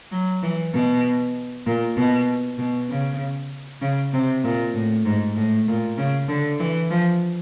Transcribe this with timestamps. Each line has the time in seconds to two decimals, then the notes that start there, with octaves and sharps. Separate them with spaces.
0.12 F#3
0.43 E3
0.73 B2
1.66 A#2
1.97 B2
2.58 B2
2.89 C#3
3.82 C#3
4.13 C3
4.44 A#2
4.74 A2
5.05 G#2
5.36 A2
5.67 A#2
5.97 C#3
6.29 D3
6.60 E3
6.90 F3